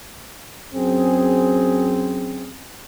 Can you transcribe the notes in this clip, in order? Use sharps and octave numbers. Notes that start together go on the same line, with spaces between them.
F#2 C4 G#4